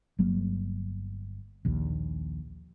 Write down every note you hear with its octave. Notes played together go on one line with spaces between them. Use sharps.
G1 F#3 A#3
A#1 D#2